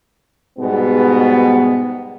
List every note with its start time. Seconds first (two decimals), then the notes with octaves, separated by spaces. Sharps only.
0.59 G#2 B2 G3 B3